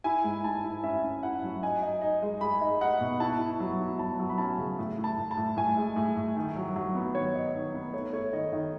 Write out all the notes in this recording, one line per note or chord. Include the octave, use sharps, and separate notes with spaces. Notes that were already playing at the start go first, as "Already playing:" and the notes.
E4 G#5
G#2
G#2 A5
E4
C#4 E5
C#4
E4 F#5
F#3
D#4 G#5
D#4
D#4
G#3
G#3 B5
D#4
D#4 F#5
B2
E4 A5
E4
F#3
E4
F#3 A5
F#3
B5
C#4 A5
C#3
A2
A2
A5
A2
A5
A2
A2 G#5
G#3
A2
A2
D#3
F#3
F#3
B3
D#3 C#5
D#4
D#3
B3
A3 C#5
A3 C#5
D#3 D#5
D#3